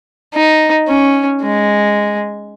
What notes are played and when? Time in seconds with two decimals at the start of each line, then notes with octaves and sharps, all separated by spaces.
0.34 D#4
0.88 C#4
1.42 G#3